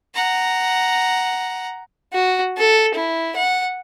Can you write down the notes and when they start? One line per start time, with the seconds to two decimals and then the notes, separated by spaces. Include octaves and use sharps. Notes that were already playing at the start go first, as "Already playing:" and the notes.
0.14 F#5 A#5
2.13 F#4
2.57 A4
2.95 E4
3.36 F#5